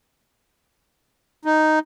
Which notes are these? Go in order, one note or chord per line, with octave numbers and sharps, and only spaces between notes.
D#4